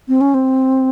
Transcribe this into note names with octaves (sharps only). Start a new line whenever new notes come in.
C4
C#4
C4